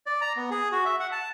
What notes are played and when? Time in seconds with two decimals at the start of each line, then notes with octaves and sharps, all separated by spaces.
0.06 D5
0.21 A#5
0.36 B3
0.50 G#4
0.72 F#4
0.85 E5
1.00 F#5
1.12 A5